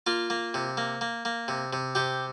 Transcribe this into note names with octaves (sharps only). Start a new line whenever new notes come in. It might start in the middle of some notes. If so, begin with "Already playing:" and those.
A#3 F4
A#3
C3
A#3
A#3
A#3
C3
C3
C3 G4